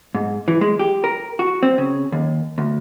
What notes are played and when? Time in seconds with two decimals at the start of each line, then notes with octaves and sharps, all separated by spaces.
0.14 G#2
0.48 E3
0.61 G#3
0.79 G4
1.04 A#4
1.39 F#4
1.63 C4
1.78 C#3
2.12 D#2
2.58 D2